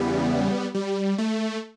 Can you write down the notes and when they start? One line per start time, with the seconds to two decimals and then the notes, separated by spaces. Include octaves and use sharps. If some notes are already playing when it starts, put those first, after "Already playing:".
Already playing: E2 C#3 E3 G3 B3
0.75 G3
1.18 A3